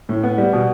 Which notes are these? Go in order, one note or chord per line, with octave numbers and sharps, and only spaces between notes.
A2
B3
G3
B2